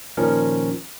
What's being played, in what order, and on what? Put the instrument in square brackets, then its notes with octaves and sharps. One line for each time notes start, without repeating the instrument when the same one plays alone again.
[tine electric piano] A#2 D#3 F3 C#4 A#4